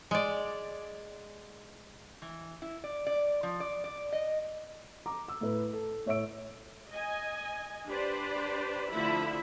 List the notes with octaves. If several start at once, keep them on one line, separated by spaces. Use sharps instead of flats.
G#3 D5
E3
E4
D5
D5
F3
D5
D5
D#5
A#5 D6
E6
A2 B4
A4
A2 C#5 E5 E6 D7
D#5 G#5
D4 G4 B4 C5 D5
D3 F3 A3 E4 E5 B5